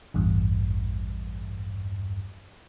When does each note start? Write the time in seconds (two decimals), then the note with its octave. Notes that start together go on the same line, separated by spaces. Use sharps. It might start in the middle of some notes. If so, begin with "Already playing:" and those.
0.14 A1 E2 G2